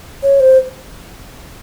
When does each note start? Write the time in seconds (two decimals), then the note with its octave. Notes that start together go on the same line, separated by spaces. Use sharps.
0.23 C#5
0.40 C5